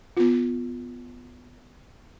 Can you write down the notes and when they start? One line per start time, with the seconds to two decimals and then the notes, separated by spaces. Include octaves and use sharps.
0.17 B3 F4